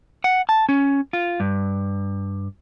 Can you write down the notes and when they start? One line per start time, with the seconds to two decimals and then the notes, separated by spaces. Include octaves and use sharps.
0.24 F#5
0.49 A5
0.69 C#4
1.13 F4
1.40 G2